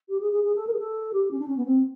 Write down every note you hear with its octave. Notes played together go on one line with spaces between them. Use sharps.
G4
G#4
G#4
G#4
A4
A#4
G#4
A4
G4
C#4
D4
C#4
B3
C4